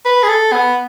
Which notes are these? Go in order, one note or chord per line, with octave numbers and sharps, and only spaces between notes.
B4
G#4
A4
B3